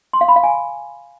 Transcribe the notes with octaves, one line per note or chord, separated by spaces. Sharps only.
C6
F5
B5
F5
G#5